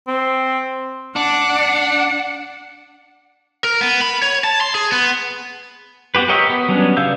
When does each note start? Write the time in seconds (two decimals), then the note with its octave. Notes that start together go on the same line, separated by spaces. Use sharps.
0.08 C4
1.16 D4 F#5
3.64 A#4
3.81 B3
4.02 B5
4.22 C#5
4.44 A5
4.61 C6
4.75 G#4
4.92 B3
6.15 B3 F#4 G4 B4
6.28 G4 A#4 C#5 D#5 E5
6.50 B3
6.69 F#3 G3 B3 C#4 D4
6.97 C#3 E5 F5 E6 G6